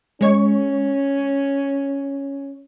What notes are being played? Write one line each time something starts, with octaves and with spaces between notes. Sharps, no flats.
G#3 C#4 C#5 C#6